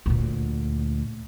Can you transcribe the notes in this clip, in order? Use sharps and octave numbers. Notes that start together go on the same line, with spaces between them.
D2 A#2